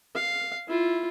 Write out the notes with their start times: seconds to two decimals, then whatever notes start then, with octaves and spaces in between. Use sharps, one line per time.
0.15 F5
0.68 E4 F4